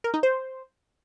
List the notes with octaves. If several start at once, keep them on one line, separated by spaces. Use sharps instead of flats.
A#4
D#4
C5